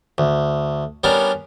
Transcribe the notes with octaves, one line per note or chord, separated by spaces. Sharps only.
D2
G3 B3 C#4 D4 A#4